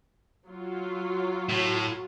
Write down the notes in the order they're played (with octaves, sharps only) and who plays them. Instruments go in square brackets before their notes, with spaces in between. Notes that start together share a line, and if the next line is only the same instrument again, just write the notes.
[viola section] F#3 F4
[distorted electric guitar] A2